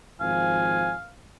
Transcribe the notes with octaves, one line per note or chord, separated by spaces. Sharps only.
G#1 F3 F5 G#5